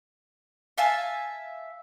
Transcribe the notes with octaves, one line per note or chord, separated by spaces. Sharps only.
E5 F5 G#5 A5